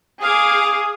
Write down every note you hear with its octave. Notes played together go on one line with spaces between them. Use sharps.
G#4 F5 D6 D#6